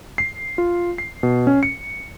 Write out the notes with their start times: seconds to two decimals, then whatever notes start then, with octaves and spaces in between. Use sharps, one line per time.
0.18 C7
0.58 F4
0.98 C7
1.23 B2
1.47 C#4
1.63 C#7